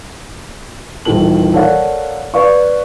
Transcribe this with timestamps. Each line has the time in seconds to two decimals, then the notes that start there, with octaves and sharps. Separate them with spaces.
1.05 D#1 D#3 E3 A4 F#7
1.54 A4 A#4 C#5 D5 F5 F#5
2.34 B4 D5 F5 C#6